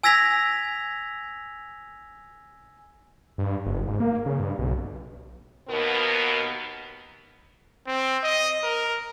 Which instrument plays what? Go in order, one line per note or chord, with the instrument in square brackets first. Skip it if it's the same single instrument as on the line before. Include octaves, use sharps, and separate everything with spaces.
[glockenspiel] G#5 E6 G#6 A#6 B6 F7
[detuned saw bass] G2
F#1
G#2
A#3
C#3
G2
B1
[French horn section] D#2 B2 B3 A#4
[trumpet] C4
D#5
A#4